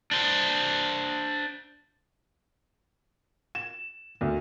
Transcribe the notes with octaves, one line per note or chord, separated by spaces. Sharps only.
D4 C5
E7
D2